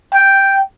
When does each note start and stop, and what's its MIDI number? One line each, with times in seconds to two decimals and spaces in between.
0.14 0.58 79